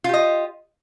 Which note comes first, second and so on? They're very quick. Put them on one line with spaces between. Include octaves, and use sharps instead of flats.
F4 G4 D#5